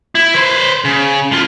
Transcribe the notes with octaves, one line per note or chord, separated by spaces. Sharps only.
E4
B4 C5
C#3
A2 F4